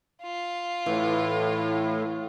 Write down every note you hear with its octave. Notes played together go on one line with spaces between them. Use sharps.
F4
A2 E3